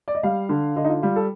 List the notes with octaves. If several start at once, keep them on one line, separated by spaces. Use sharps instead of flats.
D5
D#5
G3 F5
D3
D3 D#5
D#4
F4
G3 F4
A4